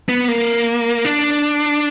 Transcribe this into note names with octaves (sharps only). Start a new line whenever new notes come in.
B3
A#3
D4